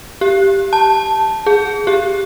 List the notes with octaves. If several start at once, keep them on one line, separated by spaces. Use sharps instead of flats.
G4
A5
G#4
G4